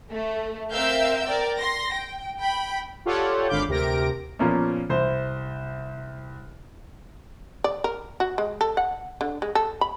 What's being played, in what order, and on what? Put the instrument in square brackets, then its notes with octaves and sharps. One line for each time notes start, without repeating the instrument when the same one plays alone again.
[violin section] A3
C4 A#4 E5 F5 E6 G6
A#4 D5 G5
C6 A#6
G5
G5 B5
[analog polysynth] F4 G4 A4 C#5 D5 F#5
G#1 D3 F5 B5 D6 G6
D2 C3 G4 A#4 A#6 D7
[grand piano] A#2 F3 A#3 B3 C#4
C2 C5
[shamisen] D5
A#4
F#4
G#3
A4
F#5
D3
G#3
A4
B5